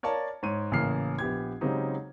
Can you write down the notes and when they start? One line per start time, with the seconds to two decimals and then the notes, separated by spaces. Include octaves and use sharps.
0.03 A#4 C#5 D5 F5 A5
0.43 G#2 C#5 D#7
0.72 A1 C#3 A#3 F6 C7
1.19 A#1 B3 G4 G#6
1.61 C#3 F#3 G#3 C4 D#4 G4